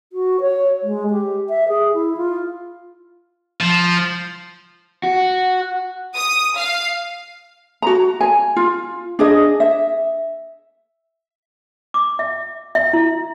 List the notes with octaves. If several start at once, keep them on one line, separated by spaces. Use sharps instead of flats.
F#4
C#5
G#3
G4
E5
G#4
E4
F4
F3
F#4
D#6
F5
F#4 A#5
G#5
F4
D4 G#4 D#5
E5
D6
E5
E5
E4